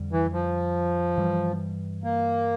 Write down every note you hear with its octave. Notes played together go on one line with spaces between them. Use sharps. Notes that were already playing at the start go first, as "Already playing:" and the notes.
Already playing: F2 D3 G3
E3
F3
G2 E3 G3
A#3